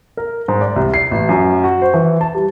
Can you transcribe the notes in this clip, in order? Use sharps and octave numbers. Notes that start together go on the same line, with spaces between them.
A#4
G#2
D5
C2
C7
A1
F#2
F#4
C5
E3
A5
G3